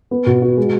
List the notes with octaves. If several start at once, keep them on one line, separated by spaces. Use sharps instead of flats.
B3
B2
F#4
G#3